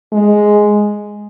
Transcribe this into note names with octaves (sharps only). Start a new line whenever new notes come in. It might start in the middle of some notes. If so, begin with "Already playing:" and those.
G#3